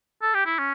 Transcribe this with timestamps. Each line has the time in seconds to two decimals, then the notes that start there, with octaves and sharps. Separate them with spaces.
0.22 A4
0.34 G4
0.46 E4
0.59 C#4